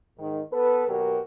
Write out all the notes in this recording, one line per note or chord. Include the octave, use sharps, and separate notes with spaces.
G#2 D#3
B3 A4 B4
D#2 B2 F#3 F#4 G4 A#4